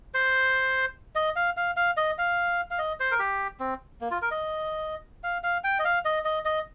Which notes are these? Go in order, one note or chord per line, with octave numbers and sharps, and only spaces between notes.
C5
D#5
F5
F5
F5
D#5
F5
F5
D#5
C5
A#4
G4
C4
A#3
F4
A#4
D#5
F5
F5
G5
D#5
F5
D#5
D#5
D#5